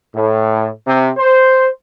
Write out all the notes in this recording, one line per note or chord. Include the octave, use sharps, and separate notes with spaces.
A2
C3
C5